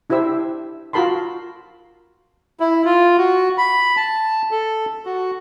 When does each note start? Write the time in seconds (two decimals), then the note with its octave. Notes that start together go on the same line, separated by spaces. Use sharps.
0.10 D4 E4 G4 C5 E5 E6
0.93 F4 F#4 A#4 A5 B5 C6
2.60 E4
2.85 F4
3.18 F#4
3.58 B5
3.97 A5
4.51 A4
5.06 F#4